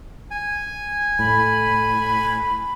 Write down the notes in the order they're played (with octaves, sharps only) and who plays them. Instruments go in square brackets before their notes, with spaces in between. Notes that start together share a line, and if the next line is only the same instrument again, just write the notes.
[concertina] G#5
[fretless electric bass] A2 [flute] B5